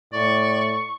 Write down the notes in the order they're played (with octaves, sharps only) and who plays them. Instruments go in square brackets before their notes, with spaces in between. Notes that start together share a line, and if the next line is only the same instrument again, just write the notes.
[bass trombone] A2 [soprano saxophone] D5 [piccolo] C#6